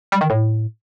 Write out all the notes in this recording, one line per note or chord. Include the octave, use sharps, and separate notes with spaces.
G3
D#3
A2